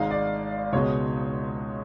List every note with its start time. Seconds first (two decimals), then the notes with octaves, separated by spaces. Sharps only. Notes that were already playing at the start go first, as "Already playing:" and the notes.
Already playing: G#1 G#2 G#3 F5
0.11 D5
0.73 C#2 B2 G#3 C#5